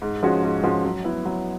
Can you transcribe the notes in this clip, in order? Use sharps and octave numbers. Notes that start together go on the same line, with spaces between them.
G#2
F3 G#3 C#4 F#4
G#2
F3 G#3 C#4 F#4
F#3
B3 E4
F#3